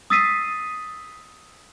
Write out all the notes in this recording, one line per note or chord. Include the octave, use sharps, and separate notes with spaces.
D#6 E6 A6 B6 C7 D#7